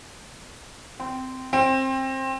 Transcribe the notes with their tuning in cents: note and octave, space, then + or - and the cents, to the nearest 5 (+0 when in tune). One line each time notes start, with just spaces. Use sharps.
C4 -15
C4 +20